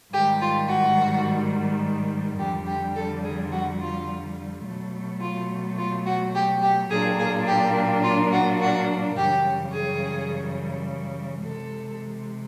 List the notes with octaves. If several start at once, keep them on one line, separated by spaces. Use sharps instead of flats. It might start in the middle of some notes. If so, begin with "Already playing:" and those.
G#2 D#3 G3 G4
F4
F#4
F2 D3 G3 G4
G4
A4
G#4
F#4
F4
B2 F#3 A3
F4
F4
F#4
G4
G4
A#2 F#3 A#3 D4 G#4
G#4
G4
F4
F#4
F#4
F#2 C#3 E3 G3 G4
G#4
C3 E3 G#3 A4